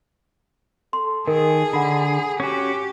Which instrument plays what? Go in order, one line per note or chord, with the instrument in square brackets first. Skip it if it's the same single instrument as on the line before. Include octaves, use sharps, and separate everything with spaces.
[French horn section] A4 [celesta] C6
[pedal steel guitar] D#3 [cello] G#4 [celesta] A#4
[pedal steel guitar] D3 [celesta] F#5 B5
[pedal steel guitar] C#4 F#4 [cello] G4